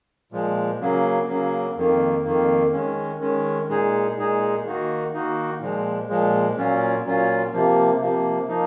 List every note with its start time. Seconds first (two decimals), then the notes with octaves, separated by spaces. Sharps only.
0.32 A#2 F3 G#3
0.80 C#3 F#3 A#3
1.29 C#3 F#3 A#3
1.76 F2 D#3 A#3
2.24 F2 D#3 A#3
2.73 D#3 G#3 C#4
3.20 D#3 G#3 C#4
3.69 A#2 G#3 D#4 G#4
4.17 A#2 G#3 D#4 G#4
4.65 D#3 A#3 D#4 F#4
5.13 D#3 A#3 D#4 F#4
5.61 A#2 F3 G#3
6.09 A#2 F3 G#3
6.56 A#2 F#3 C#4 F4
7.05 A#2 F#3 C#4 F4
7.53 C3 F3 A#3
8.01 C3 F3 A#3
8.48 F3 A#3 D#4